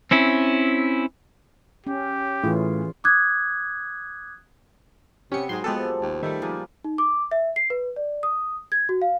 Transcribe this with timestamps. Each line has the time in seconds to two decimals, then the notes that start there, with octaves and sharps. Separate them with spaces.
0.11 C4 C#4 E4
1.87 C#4 G4
2.43 A2 E3 C#4 F4 G#4
3.04 D6 D#6 F#6 G#6
5.32 C3 B3 C#4 G4 C#7
5.49 G#2 F#3 G#4 C6
5.64 A#2 F3 G#3 B3 G4 A4
6.01 D#2
6.23 D#3 G3 A3 E5
6.42 F3 A#3 G#4 B4
6.84 D#4
6.98 D6
7.31 E5
7.56 C7
7.70 B4
7.96 D5
8.23 D#6
8.72 G#6
8.89 F#4
9.02 F5